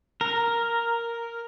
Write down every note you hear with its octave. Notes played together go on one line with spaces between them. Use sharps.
A#4